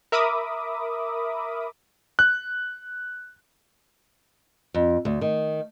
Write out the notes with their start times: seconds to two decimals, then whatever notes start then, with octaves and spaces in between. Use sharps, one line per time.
0.12 A#4 E5 B5 D6 D#6
2.19 F#6
4.74 F2
5.05 D2
5.21 D#3